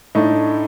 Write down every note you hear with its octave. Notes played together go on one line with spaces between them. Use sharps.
A2 A3 D4 D#4